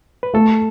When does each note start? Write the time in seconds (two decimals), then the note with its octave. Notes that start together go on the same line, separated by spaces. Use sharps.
0.23 B4
0.34 A3 A4